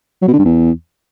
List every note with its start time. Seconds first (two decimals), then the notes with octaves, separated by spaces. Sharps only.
0.22 F#3
0.28 B2
0.33 D3
0.39 G2
0.45 E2